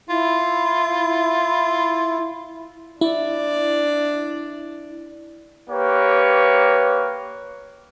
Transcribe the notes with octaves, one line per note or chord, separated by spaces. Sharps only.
E4 F4
D4 E4 D5
A#3 G4 B4 C#5